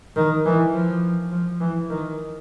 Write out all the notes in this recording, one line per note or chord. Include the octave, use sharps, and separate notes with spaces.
D#3
E3
F3
F3
E3
D#3